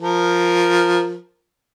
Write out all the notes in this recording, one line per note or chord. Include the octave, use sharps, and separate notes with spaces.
F3 A#4